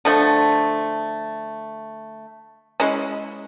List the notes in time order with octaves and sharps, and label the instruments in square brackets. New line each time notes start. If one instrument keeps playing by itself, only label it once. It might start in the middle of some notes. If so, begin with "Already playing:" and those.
[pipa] D3 F3 A3
G#3 C#4 E4